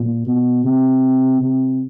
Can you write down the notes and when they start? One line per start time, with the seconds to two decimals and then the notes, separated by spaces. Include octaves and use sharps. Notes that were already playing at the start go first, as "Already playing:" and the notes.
Already playing: A#2
0.26 B2
0.64 C3
1.41 C3